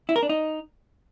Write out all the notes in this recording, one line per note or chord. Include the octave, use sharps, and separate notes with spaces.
E4
A#4
D4
D#4